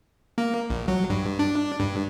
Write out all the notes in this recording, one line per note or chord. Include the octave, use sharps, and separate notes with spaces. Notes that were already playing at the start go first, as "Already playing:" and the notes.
A#3
A#1
F#3
G2
D4
G2